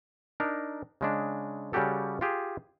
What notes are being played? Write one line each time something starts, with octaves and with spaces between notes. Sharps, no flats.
D4 D#4 A#4
C#3 G#3 D4
C#3 G3 C#4 F#4 G4 A4
F4 G4 G#4